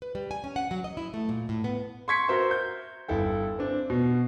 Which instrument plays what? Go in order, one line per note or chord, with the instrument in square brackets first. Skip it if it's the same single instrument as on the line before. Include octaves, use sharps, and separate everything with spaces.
[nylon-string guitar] B4
G3
G#5
C#4
F#5
F#3
D#5
E4
A3
A#2
A2
B3
[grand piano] C6 C#6 G#6 B6 C#7
F#4 A#4 C5 E5 C6
G6
G1 E4 A4 G5
C4 D4
B2